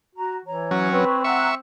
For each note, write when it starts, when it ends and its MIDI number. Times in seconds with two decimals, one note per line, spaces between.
0.16 0.39 66
0.16 0.34 82
0.45 0.88 52
0.45 0.83 73
0.45 0.83 82
0.71 1.05 54
0.71 1.05 61
0.91 1.56 60
0.91 1.24 71
0.91 1.24 73
0.91 1.24 85
1.24 1.55 76
1.24 1.47 78
1.24 1.47 82
1.24 1.55 85
1.24 1.47 90